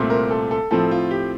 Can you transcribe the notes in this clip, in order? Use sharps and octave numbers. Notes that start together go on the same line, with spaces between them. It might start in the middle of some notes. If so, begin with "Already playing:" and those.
Already playing: C2 A#2 A3 C4
A#4
A4
A4
A2 F3 C4 A4
F4
G4